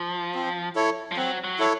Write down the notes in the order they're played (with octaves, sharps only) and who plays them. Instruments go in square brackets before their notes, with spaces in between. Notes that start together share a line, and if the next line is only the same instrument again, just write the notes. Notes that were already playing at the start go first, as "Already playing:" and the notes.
Already playing: [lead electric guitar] F3
[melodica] C4
E4 A4 C#5
[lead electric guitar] F3
[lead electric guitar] F#3 [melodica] C4
[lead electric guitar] F#3
[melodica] E4 A4 C#5